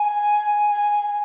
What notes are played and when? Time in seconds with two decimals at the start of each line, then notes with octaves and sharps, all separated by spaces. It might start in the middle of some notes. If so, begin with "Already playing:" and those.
Already playing: G#5
0.71 G#5